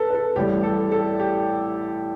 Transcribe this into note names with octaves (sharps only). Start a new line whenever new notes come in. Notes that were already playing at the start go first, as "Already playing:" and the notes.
Already playing: A4 B4
B4
A4
A1 A2 G3 G4
A4
A4
G4